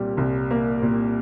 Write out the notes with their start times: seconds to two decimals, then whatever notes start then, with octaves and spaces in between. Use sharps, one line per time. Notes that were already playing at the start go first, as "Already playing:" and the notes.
Already playing: C2 A#2 G3 A#3
0.17 C2
0.51 A#3
0.82 A#2